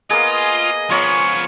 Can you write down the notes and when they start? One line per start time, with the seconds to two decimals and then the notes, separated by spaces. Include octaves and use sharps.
0.10 A#3 B3 F4 G#4 D#5
0.90 F3 B3 F4 C#5 A#5